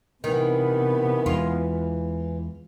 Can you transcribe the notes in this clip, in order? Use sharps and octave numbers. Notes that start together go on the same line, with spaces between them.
C3 D#3 E3 B3
E2 G#3 F4